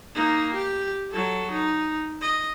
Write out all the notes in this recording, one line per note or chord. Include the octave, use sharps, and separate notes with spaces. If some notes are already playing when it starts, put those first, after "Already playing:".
A#3 D#4
G4
F#3 A4
D#4
D#5